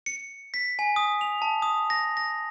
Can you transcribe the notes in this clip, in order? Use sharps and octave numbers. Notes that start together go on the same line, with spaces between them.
C#7
B6
G#5
D#6
F7
A5
D#6
A#6
A#6